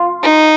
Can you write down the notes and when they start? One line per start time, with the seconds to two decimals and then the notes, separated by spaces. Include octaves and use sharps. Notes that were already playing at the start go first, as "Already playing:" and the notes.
Already playing: F4
0.22 D#4